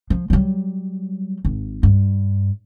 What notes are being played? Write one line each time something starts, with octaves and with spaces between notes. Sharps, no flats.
F3
F#3 G3
G#1
G2